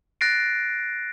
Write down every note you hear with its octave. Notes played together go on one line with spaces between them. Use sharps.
F#6 A6 A#6 C7 D7